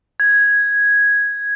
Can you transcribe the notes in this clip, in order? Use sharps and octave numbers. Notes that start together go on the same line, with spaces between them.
G#6